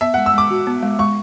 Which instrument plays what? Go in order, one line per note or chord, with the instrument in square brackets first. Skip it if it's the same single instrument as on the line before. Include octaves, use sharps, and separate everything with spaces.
[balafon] B3 [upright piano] E5
[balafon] G#3 [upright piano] F#5
[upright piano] E6
[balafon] G#3 [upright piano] D6
[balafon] F#4
B3
G#3
[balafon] G#3 [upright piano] C#6